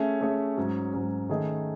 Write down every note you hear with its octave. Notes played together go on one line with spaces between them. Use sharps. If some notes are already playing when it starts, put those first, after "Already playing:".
Already playing: A3 C#4 G#4 C#5 E5
A3 C#4 G#4 C#5 E5
G#2 F#3 C#4
G#2 F#3 C#4
D#3 A3 C#4 G#4 D#5